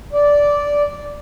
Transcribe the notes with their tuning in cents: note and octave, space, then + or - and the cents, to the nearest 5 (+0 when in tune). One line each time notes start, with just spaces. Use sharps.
D5 -10